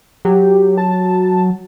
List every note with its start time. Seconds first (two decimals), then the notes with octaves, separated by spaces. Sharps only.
0.25 F#3 G4
0.78 A5